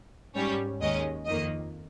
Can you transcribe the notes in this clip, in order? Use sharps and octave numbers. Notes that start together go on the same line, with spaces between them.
G#2 G3 C#4 C#5
D#2 D#3 G#3 C#4 D#5
F2 D#3 A#3 D#5